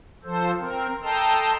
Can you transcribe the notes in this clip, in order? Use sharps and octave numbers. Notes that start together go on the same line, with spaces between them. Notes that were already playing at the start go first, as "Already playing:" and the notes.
F3 A4 C5
C4 A#4
A4 D#5 G5 A5 A#5 C6